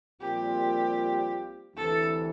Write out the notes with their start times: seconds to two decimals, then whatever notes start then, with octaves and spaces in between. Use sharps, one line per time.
0.21 A#1 A#2 G3 C4 F4 G4
1.76 D2 C3 E3 A4